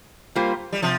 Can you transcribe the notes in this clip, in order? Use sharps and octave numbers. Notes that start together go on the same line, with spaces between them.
G3 A#3 F4 C5
G3
C3 F3